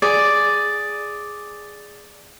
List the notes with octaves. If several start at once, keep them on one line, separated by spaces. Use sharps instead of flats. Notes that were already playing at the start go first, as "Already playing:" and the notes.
G#4 D5